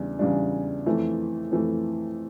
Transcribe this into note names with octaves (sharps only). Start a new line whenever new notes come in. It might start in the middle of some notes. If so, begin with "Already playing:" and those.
Already playing: E2 C#3 G3 D4
E2 C#3 G3 D4
F2 E3 A3
F2 E3 A3